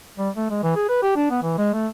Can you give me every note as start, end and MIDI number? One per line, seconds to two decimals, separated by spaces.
0.18 0.29 55
0.36 0.48 57
0.50 0.60 56
0.63 0.72 52
0.76 0.88 68
0.89 0.98 71
1.03 1.12 67
1.16 1.29 62
1.31 1.40 59
1.43 1.58 52
1.58 1.73 56
1.74 1.87 57